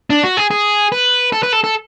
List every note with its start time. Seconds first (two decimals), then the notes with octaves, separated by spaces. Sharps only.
0.10 D4
0.23 F#4
0.37 G#4
0.51 G#4
0.92 B4
1.32 A4
1.43 B4
1.53 A4
1.64 A4